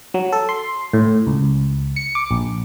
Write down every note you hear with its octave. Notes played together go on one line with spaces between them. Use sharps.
F#3
A4
C6
A2
C#2
C#7
D6
A#1